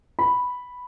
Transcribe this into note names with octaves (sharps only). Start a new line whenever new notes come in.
B5